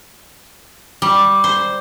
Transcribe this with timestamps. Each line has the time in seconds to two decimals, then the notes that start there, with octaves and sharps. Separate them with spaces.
1.02 G3
1.44 C5